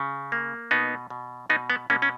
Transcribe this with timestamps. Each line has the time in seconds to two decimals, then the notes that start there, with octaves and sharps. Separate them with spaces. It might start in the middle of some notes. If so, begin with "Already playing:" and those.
Already playing: C#3
0.32 A#3
0.71 B2 B3 D#4
1.10 B2
1.50 B2 B3 D#4
1.70 B3
1.90 B2 A#3 C#4
2.02 C#4